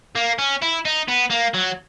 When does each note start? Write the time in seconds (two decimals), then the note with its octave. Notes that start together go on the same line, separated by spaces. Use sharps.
0.16 A#3
0.39 C#4
0.62 E4
0.85 D#4
1.08 B3
1.30 A#3
1.54 F#3